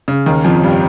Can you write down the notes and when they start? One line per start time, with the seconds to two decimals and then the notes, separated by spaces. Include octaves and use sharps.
0.08 C#3
0.26 D#2 D#3
0.44 F2 F3
0.63 G2 G3